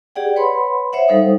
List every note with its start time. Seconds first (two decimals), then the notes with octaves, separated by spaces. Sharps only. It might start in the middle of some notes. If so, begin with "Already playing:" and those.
0.16 G4 G#4 D5 F#5 G5
0.36 B4 C#5 F#5 B5 C6
0.93 C5 C#5 E5 F#5
1.08 G3 D#4 A4 C5 F5 D#6